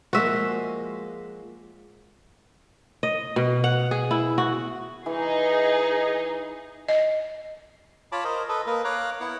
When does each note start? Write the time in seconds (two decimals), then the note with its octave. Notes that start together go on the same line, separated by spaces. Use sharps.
0.13 F3 G#3 A#3 F#4 E5
3.03 D#5
3.36 B2
3.64 F#5
3.91 G#4
4.11 E4
4.38 F#4
5.06 E3 D#4 G#4
6.88 D#5
8.12 F4 C#5 A5 B5 D6
8.24 A#4 C5 D#5
8.49 A4 B4 D#5
8.67 A#3 A#4 B4
8.84 C#5 F5 A#5 D6 F#6
9.20 B3 E4 F#5